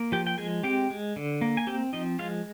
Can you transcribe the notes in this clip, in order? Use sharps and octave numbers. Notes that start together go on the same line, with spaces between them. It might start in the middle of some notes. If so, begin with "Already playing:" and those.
Already playing: A#3
F3 G4 G5
G5
G#3 G#4 G#5
C4 G4 G5
G#3
D3
A#3
G#5
C4 G4 G5
F3 D#4 D#5
G#3 F4 F5